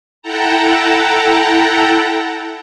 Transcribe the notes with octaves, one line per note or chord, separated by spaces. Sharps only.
E4 A4 F#5 G5 A5 A#5